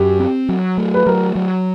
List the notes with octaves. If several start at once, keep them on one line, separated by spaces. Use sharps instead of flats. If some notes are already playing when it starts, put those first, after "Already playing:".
Already playing: F#2 G4
C4
F#3
A3
B4
F#3 A#4
F#3